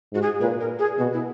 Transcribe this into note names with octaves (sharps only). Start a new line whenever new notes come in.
G#2 F#4
G#4
A#2 B4
A#4
G#4
B2 F#4
E4